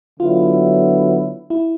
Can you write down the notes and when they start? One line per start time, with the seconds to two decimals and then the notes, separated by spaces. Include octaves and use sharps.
0.19 D3 F#3 B3 E4 F4
1.50 E4